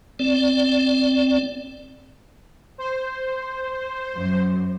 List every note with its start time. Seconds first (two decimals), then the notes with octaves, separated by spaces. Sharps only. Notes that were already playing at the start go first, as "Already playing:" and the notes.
0.19 C4 D5
2.78 C5
4.14 F#2